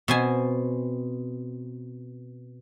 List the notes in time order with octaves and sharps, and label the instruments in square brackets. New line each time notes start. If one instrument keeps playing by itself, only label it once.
[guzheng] B2 C4 G#5